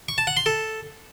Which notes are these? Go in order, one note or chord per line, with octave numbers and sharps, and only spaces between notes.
C#6
A5
F#5
C6
A4